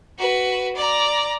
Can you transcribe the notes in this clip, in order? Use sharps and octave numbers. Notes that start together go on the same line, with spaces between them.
F#4 B4
D5 A#5